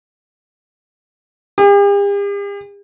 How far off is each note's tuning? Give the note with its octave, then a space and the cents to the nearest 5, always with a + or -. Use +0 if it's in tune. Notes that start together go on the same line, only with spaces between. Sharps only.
G4 +45